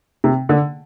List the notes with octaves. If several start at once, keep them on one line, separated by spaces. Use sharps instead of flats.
C3
D3